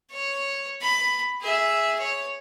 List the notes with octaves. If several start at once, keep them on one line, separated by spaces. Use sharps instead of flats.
C#5
B5
G#4 E5
C#5